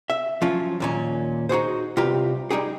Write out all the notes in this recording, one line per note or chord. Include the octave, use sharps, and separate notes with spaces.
E5
F3 F#3 C#4 F4
D#2 A#2 C#4
D#4 F#4 G#4 C5
C2 F4 G4 B4 A#5
G3 D#4 G4 G#4